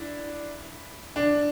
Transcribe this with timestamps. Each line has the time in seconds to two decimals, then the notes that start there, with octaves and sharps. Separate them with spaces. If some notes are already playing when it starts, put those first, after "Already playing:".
Already playing: D4 E4
1.16 D4